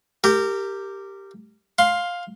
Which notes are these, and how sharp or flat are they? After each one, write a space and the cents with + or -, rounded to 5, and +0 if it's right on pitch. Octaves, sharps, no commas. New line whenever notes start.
G4 +0 A#4 -25
F5 +10 C6 +5